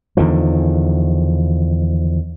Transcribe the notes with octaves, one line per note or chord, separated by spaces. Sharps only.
E2 D3 D#3 F3